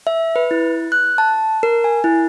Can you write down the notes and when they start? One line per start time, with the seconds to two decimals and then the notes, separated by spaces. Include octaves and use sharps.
0.07 E5
0.36 B4
0.51 E4
0.92 F#6
1.18 A5
1.63 A#4
1.84 G#5
2.04 E4